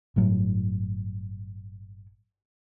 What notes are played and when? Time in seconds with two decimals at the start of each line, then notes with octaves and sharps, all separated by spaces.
0.16 G1 A2 F#3